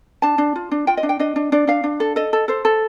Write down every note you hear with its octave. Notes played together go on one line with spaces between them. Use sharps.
D4 A5
D4
F4
D4
F4 G5
D#5
D4
G5
D4 D#5
D4
D4 D5
D4 F5
D4
A4
A4 D#5
A4
A4 C5
A4